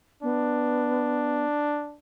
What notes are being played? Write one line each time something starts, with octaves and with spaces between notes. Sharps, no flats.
B3 D4